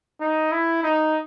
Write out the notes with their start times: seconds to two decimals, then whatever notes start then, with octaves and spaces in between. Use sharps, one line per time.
0.21 D#4
0.52 E4
0.83 D#4